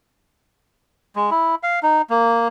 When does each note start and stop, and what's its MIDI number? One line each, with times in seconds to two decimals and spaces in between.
1.16 1.30 56
1.31 1.55 64
1.63 1.80 77
1.83 2.02 63
2.10 2.48 58